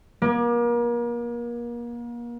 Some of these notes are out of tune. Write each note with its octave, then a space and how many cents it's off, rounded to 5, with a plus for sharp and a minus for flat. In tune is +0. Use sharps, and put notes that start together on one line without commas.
A#3 +35